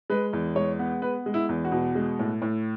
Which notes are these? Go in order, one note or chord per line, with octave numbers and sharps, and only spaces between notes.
G#3 B4
E2
G#3 C#5
B3
B3 B4
G#3
E4
E2
F#4
B2
G#3
A2
A2